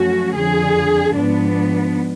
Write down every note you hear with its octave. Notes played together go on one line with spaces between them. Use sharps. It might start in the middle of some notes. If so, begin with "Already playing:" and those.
Already playing: F#2 F3 A3 C#4 F#4
F2 D3 F3 G#4
G#2 F3 B3 D4